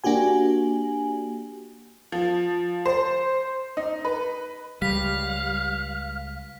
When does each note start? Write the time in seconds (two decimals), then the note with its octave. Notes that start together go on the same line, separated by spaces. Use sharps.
0.04 A#3 D4 F#4 G4 G#5
2.12 F3
2.86 C5
3.77 D#4
4.05 B4
4.82 C#2 G3 F5 B6